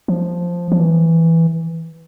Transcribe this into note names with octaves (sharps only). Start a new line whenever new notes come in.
F3
F3
E3